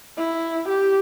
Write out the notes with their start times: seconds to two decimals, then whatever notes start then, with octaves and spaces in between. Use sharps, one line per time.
0.17 E4
0.68 G4